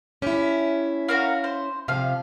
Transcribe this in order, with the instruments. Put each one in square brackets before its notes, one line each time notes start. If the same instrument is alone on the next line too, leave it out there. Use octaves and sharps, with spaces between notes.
[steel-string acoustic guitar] C#4 E4 [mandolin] G4
[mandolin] F#4 A#4 F5
C5
[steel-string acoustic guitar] C3 F3 [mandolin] F5